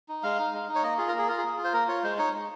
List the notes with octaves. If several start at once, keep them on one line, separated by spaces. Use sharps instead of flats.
D#4
G#3 F5
D#4
G#3
D#4
C#5
A#3 D#5
F4 G#4
A#4
A#3 G#4
F4 A#4
G#4
A#3
F4
C5
A#3 A#4
F4 C#5
G#3 C5
D#4 C#5
G#3